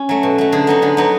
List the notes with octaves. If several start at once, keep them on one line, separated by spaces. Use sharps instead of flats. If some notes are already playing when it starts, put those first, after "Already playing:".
Already playing: C#4
F#3 A3
B2
F#3 A3
D3 G#4
F#3 B3 D#4
D3 G#4
F#3 B3 D#4